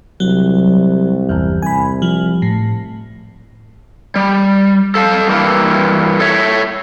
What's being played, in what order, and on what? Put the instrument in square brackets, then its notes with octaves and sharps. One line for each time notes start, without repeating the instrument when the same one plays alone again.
[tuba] C2 [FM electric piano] F#3
[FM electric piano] G1 E2
[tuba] C2 [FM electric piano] G#5 B5
[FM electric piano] F3
A2
[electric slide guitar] G3
A4 F5 A5
G2 E3 A#3
A4 C#5 E5